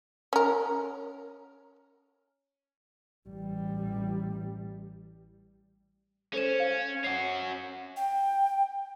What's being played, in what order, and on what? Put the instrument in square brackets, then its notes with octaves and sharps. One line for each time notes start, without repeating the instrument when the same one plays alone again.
[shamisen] C#4 A#4
[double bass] A1 G3
[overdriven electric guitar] C#4 [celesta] A4 C5 E7
[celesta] F5
[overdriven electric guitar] C#4 F#4 [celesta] C7
[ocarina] G5